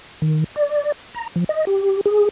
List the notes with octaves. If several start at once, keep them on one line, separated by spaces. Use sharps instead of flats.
D#3
D5
A#5
F3
D#5
G4
G#4